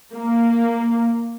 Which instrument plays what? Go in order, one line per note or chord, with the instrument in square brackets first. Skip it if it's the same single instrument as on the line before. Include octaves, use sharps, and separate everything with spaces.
[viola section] A#3